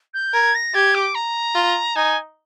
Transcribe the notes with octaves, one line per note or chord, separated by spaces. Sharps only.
G6
A#4 G#6
A#6
G4 G#6
D6
A#5
F4
D#4 G#5